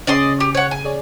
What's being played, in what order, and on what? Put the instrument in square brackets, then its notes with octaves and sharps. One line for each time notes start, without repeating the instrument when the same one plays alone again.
[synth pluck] C#3 C#4 G#4 [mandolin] D5 D#5 C6
[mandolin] G4
C#5 F#5
G#5
[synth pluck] G#4 C#5 D5